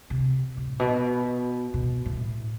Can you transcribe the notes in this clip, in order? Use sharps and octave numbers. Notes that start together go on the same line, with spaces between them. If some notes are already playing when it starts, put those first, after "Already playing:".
C3
A2
B2
B2
A2